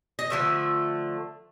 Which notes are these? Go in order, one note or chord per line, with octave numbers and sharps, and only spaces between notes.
D#5
D3 F3 A3 E5